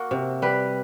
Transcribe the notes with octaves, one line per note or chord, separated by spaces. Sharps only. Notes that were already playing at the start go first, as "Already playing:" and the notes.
Already playing: A#3 F#4
C3
G3 B4